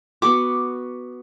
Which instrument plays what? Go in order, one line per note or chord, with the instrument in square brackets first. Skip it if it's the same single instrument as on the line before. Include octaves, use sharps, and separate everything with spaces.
[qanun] B3 F#4 [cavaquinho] D6